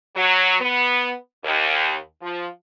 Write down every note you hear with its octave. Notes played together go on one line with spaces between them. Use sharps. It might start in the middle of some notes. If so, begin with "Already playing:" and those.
F#3
B3
D#2
F3